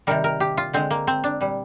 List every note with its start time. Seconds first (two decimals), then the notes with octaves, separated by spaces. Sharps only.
0.07 C3 D#3 G3 A#4
0.24 A#4
0.40 G4
0.57 F4
0.73 D3 G#3 C4
0.91 A#3
1.07 C4
1.24 D4
1.41 A#2 G3